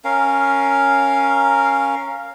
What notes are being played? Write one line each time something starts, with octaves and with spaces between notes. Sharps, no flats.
C#4 A#4 F5